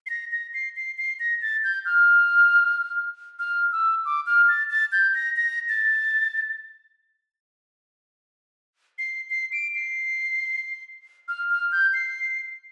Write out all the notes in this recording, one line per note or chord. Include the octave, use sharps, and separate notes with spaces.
C7
A#6
A#6
C7
C7
C7
A#6
A6
G6
F6
F6
E6
D6
F6
A6
A6
G6
A#6
A#6
A6
C7
C7
D7
C7
F6
F6
G6
C7